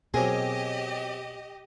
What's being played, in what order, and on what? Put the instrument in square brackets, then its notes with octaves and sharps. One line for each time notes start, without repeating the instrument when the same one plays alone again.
[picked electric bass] B2 [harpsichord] F#3 C4 A#4 [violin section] G4 D#5 [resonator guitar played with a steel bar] G#4